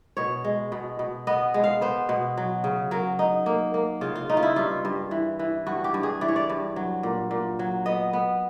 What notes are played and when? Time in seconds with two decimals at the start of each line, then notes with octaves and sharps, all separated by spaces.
0.17 B2 C#5
0.44 G#3
0.72 B2
0.99 B2
1.27 B3 D#5
1.54 G#3
1.64 F5
1.81 B3 C5
2.09 B2
2.37 F#3
2.64 C#3
2.91 F#3 A#4
3.19 D#4
3.46 A#3
3.74 A#3
4.01 C#3 F4
4.15 F4
4.29 C#3 D#4
4.37 F4
4.43 E4
4.56 G2 F4
4.85 G2
5.11 E3
5.39 E3
5.67 G2 F#4
5.84 G4
5.94 G2
6.03 G#4
6.21 E3 D5
6.28 C#5
6.36 D5
6.49 G2
6.76 F#3
7.03 A#2
7.31 A#2
7.59 F#3
7.86 B3 D#5
8.13 B3